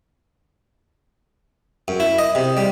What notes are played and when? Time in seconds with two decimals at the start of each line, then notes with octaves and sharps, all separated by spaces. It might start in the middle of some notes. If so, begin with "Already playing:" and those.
1.88 F#2
2.00 E4
2.19 D#5
2.35 C3
2.57 G3